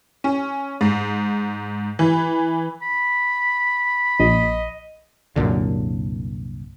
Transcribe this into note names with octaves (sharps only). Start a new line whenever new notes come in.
C#4
G#2
E3
B5
A#1 D#5
C2 F#2 A#2 D3